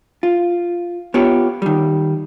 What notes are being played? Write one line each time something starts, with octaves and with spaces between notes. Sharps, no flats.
F4
B3 F4 G4 C#5
D#3 G3